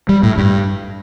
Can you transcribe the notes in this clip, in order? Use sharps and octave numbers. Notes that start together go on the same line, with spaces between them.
G3
A2
G2